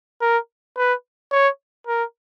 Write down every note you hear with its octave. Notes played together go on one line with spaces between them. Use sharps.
A#4
B4
C#5
A#4